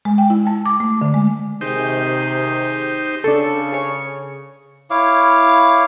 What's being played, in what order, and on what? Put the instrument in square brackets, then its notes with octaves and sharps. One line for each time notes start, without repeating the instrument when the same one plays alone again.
[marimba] G#3
G5
E4
A5
D6
A3
D3
G#3
[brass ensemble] C3 D#3 G#4 [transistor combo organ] D#4 G4 C5
[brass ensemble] C#3 [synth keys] D4 A4 [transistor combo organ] C#6
[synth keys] G#4 C#5
[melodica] E4 C#5 F5 D6